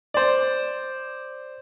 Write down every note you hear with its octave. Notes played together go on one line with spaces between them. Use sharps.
C5 D5